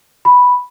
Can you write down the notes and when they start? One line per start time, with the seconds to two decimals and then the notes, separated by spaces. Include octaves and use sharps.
0.25 B5